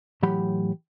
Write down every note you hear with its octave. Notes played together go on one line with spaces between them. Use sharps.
A2 E3 F#3 G4 F#5 B5